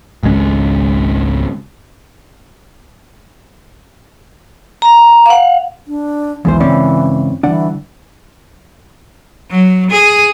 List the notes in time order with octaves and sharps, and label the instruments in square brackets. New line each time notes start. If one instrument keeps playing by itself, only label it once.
[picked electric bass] G#1 C#2 G#3 C#4
[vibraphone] A#5
F5 F#5
[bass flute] D4
[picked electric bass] B1 F#3 G#3 [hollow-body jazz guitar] E2 D#3 C5 [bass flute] E3
[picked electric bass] G2 C#3 G#3 [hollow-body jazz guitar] C4 C#4 D5
[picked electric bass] D3 G3 [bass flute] E3 [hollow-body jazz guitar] D4 F#5
[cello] F#3
G#4